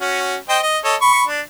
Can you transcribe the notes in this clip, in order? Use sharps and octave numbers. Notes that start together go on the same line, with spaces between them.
C#4 F#4
C5 D#5 G5
D#5
A4 C#5 D#5
B5 C#6
D4